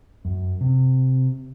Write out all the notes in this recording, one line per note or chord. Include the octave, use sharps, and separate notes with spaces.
F#2
C3